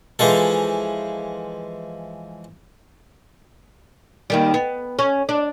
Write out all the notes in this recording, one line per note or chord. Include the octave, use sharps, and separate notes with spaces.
E3 F3 G#3 A4
D#2 D#3 G3
B3
C#4
D4